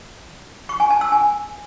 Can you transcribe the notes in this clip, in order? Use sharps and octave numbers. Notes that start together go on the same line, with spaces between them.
C#6
G#5
A5
E6
G#5